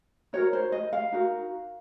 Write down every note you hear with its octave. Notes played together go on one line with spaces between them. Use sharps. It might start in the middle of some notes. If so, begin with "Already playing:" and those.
D#4 F#4 A#4 C#5
C5
D#5
F5
D#4 F#4 A#4